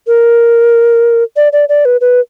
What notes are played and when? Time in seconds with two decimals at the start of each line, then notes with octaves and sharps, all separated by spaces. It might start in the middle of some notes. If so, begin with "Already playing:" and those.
0.07 A#4
1.36 D5
1.53 D5
1.69 D5
1.85 B4
2.01 B4